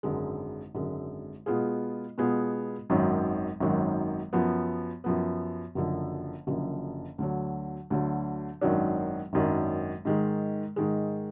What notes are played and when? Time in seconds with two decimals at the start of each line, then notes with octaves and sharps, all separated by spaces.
0.03 G#1 F#2 D3 G#3
0.75 G#1 F#2 D3 G#3
1.46 B2 G#3 B3 F4 G#4
2.18 B2 G#3 B3 F4 G#4
2.90 G#1 F#2 D#3 F#3
3.60 G#1 F#2 D#3 F#3
4.33 F#2 F3 B3
5.04 F#2 F3 B3
5.75 F#1 F#2 D3 F3
6.47 F#1 F#2 D3 F3
7.18 D2 D3 F#3
7.90 D2 D3 F#3
8.61 G#1 F#2 D#3 F#3 D4
9.33 G#1 F#2 D#3 F#3 D4
10.05 G#2 D#3 G#3
10.76 G#2 D#3 G#3